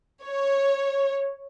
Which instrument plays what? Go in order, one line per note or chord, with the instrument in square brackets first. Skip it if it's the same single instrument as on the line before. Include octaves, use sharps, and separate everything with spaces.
[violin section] C#5